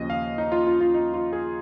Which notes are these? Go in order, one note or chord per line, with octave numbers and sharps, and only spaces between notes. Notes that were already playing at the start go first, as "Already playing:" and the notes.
Already playing: D#2 C#3 F3 D#5
F5
D#4
F4
F4
F4
D#4
F4
G#4